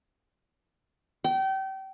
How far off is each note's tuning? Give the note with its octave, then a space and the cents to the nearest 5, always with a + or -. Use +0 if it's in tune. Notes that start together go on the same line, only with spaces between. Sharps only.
G5 -30